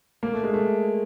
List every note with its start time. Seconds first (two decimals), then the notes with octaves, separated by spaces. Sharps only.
0.23 A#3
0.34 A3
0.44 G#3
0.54 A3